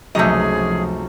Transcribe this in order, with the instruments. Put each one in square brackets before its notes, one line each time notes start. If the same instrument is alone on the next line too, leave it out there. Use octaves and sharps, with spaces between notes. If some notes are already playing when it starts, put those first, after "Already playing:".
[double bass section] C#2 F3 [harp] F#2 C3 D#4 [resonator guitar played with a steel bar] A3 D#5 [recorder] G#4